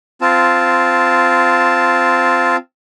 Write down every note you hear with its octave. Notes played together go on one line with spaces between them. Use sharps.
C4 F4 A5